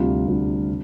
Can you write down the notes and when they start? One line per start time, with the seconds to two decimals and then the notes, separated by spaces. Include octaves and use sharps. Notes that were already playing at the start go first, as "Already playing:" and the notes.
Already playing: D2 C3 G3 D4 F4
0.27 D2 C3 G3 D4 F4
0.68 C3